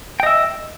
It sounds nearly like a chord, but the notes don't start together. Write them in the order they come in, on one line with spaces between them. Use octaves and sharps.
G5 D#5 E5